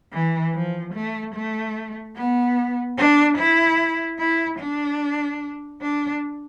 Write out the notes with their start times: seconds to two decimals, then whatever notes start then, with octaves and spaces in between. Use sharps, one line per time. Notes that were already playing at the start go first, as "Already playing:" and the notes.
0.13 E3
0.54 F3
0.95 A3
1.35 A3
2.16 B3
2.98 D4
3.38 E4
4.19 E4
4.59 D4
5.82 D4